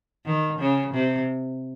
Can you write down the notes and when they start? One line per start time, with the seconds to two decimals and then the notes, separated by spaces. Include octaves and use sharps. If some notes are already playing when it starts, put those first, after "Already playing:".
0.25 D#3
0.59 C#3
0.93 C3